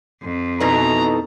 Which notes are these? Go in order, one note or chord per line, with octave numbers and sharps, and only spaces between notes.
F2
B2 E3 D#4 A4 A#5